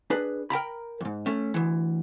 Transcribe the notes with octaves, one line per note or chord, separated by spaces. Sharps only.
D4 G#4 B4
A#4 G5 A#5 B5
F2 G#2
A3 C#4
D2 E3